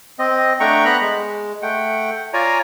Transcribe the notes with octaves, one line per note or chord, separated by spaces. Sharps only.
C4 D#5
A3 D4 F#5 G5 A#5 C#6
B3 A#5 B5 F#6
G#3
A3 F#5 G5
F4 C#5 D5 G#5 A#5